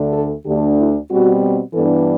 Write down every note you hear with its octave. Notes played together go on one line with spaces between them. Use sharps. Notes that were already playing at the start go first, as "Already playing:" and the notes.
Already playing: D2 D3 A3 D4
A4
D2 D3 A3 D4 G4
E4
B2 G3 C4 F#4
G2 E3 B3 D4 A4